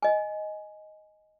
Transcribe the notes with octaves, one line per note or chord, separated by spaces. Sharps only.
D#5 G#5